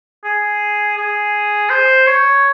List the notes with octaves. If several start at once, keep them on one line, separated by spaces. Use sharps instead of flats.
G#4
G#4
C5
C#5